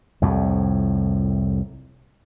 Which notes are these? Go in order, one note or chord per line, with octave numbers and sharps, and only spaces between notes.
C2 F2 A2